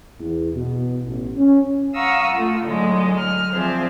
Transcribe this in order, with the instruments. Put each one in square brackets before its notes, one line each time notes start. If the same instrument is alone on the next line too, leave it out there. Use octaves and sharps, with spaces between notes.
[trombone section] E2
B2
A1
C#4
[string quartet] F5 F#5 A#5 C#6 D#6 E6
A3 F4
A2 D3 F#3 G#3
F6
F3 C4 G#4 C5 D5 E5